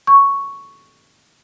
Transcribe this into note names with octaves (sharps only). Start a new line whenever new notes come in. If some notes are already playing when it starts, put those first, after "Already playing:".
C#6